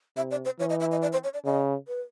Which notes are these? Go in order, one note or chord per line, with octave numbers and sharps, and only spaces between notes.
C3 E5
D5
C5
E3 C#5
D#5
E5
D#5
D5
C5
C#5
D5
C#3 D#5
B4